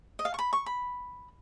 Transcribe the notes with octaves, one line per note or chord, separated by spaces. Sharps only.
D#5
F5
C#6
B5
C#6
B5